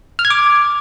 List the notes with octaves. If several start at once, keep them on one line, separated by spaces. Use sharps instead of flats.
F6
G#6
D6